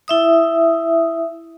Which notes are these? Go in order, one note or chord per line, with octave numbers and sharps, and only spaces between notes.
E4 E5 D#6